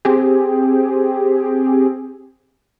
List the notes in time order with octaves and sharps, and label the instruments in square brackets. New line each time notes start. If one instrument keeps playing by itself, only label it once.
[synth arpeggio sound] C4 G4 G#4